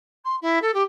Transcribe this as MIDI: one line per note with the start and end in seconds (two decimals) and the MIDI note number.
0.24 0.36 84
0.41 0.58 64
0.61 0.71 69
0.73 0.82 67